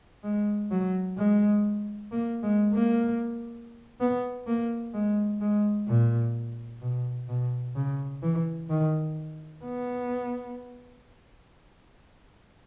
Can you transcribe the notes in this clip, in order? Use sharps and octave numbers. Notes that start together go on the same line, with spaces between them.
G#3
F#3
G#3
A#3
G#3
A#3
B3
A#3
G#3
G#3
A#2
B2
B2
C#3
E3
D#3
B3